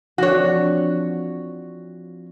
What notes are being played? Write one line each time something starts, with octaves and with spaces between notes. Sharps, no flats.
F3 C4 D4 F#4 C#5